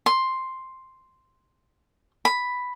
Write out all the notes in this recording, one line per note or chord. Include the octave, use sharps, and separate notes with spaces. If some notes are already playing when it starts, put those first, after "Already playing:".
C6
B5